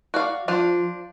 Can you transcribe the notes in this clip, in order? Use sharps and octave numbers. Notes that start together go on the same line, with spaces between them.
F#4 D5 F5
F3 D4 F4 C5